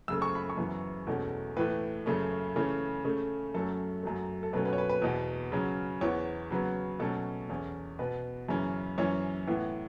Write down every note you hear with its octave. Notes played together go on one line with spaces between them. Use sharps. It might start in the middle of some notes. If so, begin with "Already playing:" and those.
F#2 C#3 A3 E6
C#6
B5
C#6
F#2 C#3 E3 B3
E2 B2 A3 C#4
A2 E3 A3 B4
F#2 C#3 A3 C#4
C#3 E3 A3 C#4
C#3 A3 C#4
F#2 F#3 A3 C#4 A4
F#2 F#3 A3
A4
B2 F#3 A3 C#4 B4
B4
C#5
B4
B4
E2 B2 B3
C#3 F#3 C#4
E2 E3 B3 C#5
C#3 F#3 B3
B2 F#3 A3 C#4 A4
E2 E3 C#4
B2 B3 B4
F#2 C#3 E3 C#4
F#2 E3 C#4 C#5
A2 E3 B3